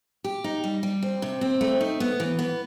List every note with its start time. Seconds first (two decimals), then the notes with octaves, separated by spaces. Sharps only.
0.24 G4
0.44 D#4
0.64 G3
0.83 G3
1.03 C4
1.22 C3
1.41 C4
1.61 A3
1.81 D#4
2.00 B3
2.20 E3
2.39 B3